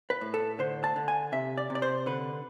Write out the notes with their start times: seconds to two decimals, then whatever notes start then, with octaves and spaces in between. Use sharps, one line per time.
0.10 B4
0.21 A2
0.34 A4
0.59 D3 C5
0.84 A5
0.96 D3
1.08 G#5
1.32 C3 E5
1.57 D5
1.70 C3
1.75 D5
1.82 C5
2.06 D3 B4